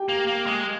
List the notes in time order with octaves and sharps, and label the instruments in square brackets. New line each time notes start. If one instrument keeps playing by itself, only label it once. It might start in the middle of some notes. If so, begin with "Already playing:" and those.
Already playing: [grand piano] G4 G5
[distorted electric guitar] A#3
A#3
G#3